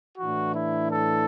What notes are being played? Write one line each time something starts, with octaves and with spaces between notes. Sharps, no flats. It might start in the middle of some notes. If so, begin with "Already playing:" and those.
A2 E3 D4 F#4
E4
A4